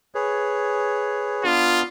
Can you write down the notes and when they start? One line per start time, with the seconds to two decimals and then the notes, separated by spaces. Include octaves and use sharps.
0.15 G#4 B4 C#5
1.45 B3 D4 F4